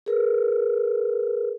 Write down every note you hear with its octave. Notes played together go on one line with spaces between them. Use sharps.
G#4 A#4 B4